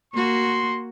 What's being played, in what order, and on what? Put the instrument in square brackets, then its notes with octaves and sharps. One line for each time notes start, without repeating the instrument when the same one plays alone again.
[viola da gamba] A#3 F#4 [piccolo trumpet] C6